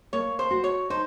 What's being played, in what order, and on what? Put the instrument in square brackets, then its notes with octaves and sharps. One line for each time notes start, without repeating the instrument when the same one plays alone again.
[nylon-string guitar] A#3 [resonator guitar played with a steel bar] C#5
[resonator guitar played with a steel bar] C5
[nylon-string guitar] F#4
[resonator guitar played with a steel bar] C#5
[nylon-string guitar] D#4 [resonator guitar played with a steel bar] C5